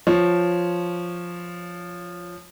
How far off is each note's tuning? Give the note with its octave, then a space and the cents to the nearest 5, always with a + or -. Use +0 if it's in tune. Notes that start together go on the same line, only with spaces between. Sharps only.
F3 +0 F4 +0 C#5 +0